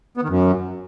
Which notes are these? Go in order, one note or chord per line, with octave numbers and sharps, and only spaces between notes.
B3
D#3
F#2